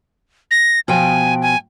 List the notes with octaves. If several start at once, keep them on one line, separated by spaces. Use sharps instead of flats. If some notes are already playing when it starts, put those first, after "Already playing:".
A#6
B2 F3 G5 G#5
G#5